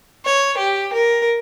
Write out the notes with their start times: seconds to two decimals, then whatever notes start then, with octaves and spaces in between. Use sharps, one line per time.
0.25 C#5
0.57 G4
0.93 A#4